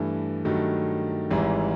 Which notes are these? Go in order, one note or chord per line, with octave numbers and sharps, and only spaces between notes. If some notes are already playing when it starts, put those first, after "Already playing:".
Already playing: G2 E3 A3
G2 D#3 F#3 A3
G#1 G#2 E3 G3